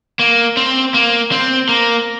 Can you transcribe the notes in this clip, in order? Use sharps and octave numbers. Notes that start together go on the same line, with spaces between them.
A#3
C4
A#3
C4
A#3